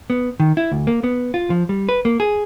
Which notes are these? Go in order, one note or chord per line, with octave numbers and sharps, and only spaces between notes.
B3
D#3
E4
D2
A#3
B3
F4
F3
G3
B4
A#3
G#4